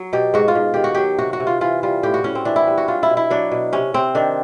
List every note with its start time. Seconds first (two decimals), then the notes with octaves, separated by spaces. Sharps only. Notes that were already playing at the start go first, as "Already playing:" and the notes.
Already playing: F#3
0.13 B2 G4
0.34 G#2 F#4
0.48 F4
0.55 G#2
0.74 D#3 G4
0.84 F#4
0.95 F#3 G4
1.18 C3 F#4
1.33 F#4
1.40 C3
1.47 F4
1.61 E3 F4
1.83 G3 F4
2.03 A2 G4
2.14 F#4
2.24 A2 C#4
2.35 C4
2.45 E3 D4
2.56 E4
2.67 G3
2.78 F#4
2.88 F#3 F4
3.03 E4
3.10 B2
3.17 E4
3.30 F#3 D4
3.52 B2
3.73 C3 C#4
3.94 C3 C4
4.15 D#3 D4